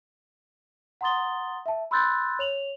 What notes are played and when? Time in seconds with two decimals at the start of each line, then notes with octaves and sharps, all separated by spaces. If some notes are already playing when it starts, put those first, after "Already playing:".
1.01 F#5 A#5 C6 D#6 A6 G7
1.66 E5 A5
1.91 B5 C6 E6 F#6 G6 A6
2.39 C#5 F7 F#7